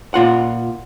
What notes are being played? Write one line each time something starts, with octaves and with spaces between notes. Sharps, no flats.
A#2 F4 F#5